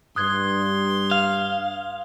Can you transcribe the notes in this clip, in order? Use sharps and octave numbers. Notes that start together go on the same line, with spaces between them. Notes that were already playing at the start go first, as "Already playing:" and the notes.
G2 C6 D#6 F#6 G#6
F5